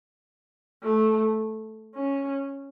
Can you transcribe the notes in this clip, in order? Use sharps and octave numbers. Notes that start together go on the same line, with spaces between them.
A3
C#4